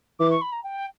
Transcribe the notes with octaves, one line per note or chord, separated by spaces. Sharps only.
E3 D6
C#6
B5
A#5
G5